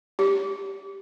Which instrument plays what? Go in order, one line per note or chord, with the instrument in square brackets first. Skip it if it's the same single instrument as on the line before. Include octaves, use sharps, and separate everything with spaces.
[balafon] G4